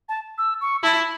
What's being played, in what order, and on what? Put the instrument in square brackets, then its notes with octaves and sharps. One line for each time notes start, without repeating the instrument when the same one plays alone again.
[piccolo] A5
E6
C#6
[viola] E4 [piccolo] A5